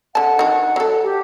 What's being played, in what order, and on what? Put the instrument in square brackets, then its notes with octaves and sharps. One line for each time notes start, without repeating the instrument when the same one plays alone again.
[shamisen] D3 A5 [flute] F#5
[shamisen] D#3 F#4
F#3 A4
[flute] G4